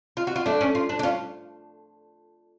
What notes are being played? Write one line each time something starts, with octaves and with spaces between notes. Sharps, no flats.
F4
F#4
F4
A3 D4
C#4
F4
D4
D4
C#4 F4